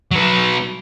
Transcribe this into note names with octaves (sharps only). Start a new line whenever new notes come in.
F#3 B4